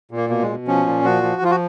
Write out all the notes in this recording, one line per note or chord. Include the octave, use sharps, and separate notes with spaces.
A#2
A#3
B2 A#3
G#3
B2
F3 C#4
A#2
F3 F#4
F3
F3 F4
F#4